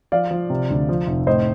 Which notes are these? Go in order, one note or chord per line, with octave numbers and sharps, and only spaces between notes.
F3 D5 F5
F3
C3
D2
F3
F1
A2 C5 D#5